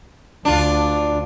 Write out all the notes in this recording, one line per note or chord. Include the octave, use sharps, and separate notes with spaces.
D2 D4 F4